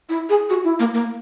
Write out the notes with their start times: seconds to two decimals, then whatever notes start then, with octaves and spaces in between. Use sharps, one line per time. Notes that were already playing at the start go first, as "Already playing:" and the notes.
0.09 E4
0.29 G#4
0.50 F#4
0.64 E4
0.79 A#3
0.94 A#3